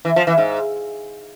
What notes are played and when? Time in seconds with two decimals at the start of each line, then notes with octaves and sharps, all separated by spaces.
0.05 E3
0.16 F3
0.27 E3
0.38 G#2